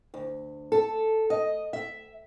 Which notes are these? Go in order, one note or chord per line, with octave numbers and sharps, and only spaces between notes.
D2
A4
D#5
E5